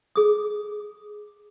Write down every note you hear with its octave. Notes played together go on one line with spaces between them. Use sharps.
G#4 D#6